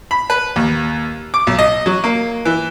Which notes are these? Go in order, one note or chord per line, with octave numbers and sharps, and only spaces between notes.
B5
B4
D#2
D6
B1
D#5
F#3
A#3
E3